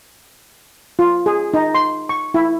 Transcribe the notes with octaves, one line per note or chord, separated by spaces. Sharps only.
F4
G#4
D#4
C6
C#6
E4